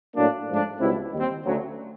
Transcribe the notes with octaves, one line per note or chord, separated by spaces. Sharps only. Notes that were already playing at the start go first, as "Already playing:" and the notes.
A2 F#3 A#3 D4
G#2 F3 A3 D4
C#2 B2 G3 C4 E4
D#2 D#3 G3 C4
D2 C#3 F#3